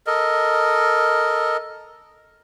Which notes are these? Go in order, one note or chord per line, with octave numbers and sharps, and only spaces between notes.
A4 A#4 D#5